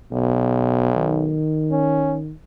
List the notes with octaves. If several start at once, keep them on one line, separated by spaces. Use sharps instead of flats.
B1 B2
D#3
C#4